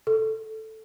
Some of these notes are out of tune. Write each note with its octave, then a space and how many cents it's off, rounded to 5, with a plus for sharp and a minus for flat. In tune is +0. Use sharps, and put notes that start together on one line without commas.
A4 +0